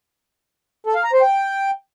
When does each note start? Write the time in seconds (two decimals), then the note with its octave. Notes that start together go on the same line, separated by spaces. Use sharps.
0.87 A4
0.95 F5
1.04 A#5
1.13 C5
1.22 G5